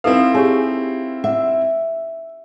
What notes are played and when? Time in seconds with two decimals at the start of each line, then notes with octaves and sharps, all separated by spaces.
0.04 C4 D#4 E4 A4 B4 F5
0.34 G4 G#4 C#5 A5
1.24 E5 F#5